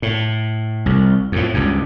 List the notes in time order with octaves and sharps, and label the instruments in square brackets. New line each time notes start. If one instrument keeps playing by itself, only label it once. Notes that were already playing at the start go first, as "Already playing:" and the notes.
[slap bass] A2
C2
F2 A2
C#2 G2